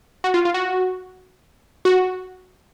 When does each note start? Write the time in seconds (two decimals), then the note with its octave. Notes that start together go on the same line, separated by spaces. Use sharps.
0.24 F#4
0.34 F4
0.45 F4
0.54 F#4
1.85 F#4